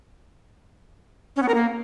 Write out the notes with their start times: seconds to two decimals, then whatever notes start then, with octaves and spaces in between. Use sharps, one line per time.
1.36 C#4
1.42 B3
1.48 A#4
1.54 A#3